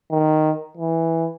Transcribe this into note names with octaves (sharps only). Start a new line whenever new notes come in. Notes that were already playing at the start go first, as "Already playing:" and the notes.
D#3
E3